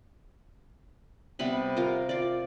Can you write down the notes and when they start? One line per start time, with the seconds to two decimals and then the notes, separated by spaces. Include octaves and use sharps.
1.39 C3 G3 B3 B5
1.77 F4 A#4
2.09 F4 D5